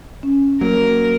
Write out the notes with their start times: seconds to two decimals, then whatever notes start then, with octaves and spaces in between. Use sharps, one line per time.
0.23 C#4
0.61 F#3 A#3 A#4